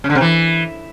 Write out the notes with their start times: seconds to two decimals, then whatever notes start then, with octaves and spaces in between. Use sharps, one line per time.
0.04 C#3
0.10 D3
0.15 C3
0.21 E3